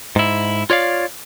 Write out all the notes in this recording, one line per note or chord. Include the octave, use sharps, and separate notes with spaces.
G#2 E4
F4 C#5 D5 F5